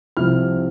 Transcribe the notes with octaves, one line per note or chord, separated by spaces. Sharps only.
C2 C3 F3 F6